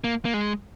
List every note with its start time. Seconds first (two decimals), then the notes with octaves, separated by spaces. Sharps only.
0.04 A#3
0.25 A#3
0.34 G#3